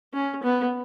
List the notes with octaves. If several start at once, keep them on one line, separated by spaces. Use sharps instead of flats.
C#4
B3